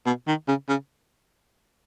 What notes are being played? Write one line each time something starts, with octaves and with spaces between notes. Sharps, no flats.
B2
D#3
C#3
C#3